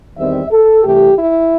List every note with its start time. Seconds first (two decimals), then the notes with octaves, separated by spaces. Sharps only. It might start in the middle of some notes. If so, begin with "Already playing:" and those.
0.17 E2 D#3 G3 C4 E5
0.50 A4
0.84 C2 C3 E3 A3 G4
1.18 E4